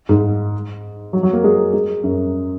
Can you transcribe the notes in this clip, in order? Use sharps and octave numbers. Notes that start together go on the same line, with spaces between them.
G#2
F#3
F#3
A#3
G#3
G#3
F#2